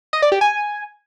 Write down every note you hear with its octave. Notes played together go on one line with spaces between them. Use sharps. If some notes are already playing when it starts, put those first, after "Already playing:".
D#5
D5
G4
G#5